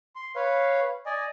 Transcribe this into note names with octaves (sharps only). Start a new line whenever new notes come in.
C6
B4 C#5 F5
D5 D#5 G#5